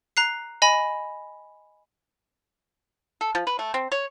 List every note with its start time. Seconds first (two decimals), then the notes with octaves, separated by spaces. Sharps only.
0.17 A#5 F#6 C7
0.62 D#5 G#5 B5
3.21 A4
3.35 F3
3.47 B4
3.59 A3
3.74 C4
3.92 C#5